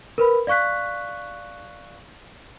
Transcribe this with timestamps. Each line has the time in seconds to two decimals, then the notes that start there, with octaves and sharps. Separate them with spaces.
0.18 A#4 B4 B5
0.47 D5 F5 C#6 F#6 B6